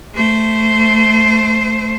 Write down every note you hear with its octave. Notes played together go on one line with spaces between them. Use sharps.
A3 C5